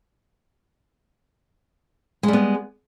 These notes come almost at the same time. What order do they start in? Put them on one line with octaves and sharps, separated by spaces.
G#3 G3 B3